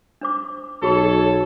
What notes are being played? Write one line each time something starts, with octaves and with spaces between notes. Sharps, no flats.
D4 C5 D6
B1 F#4 G#4 A4 C#5 B5